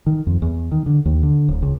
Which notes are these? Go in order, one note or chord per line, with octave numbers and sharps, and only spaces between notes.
D#3
F2
E2
D#3
D3
D#2
D3
D1
C#2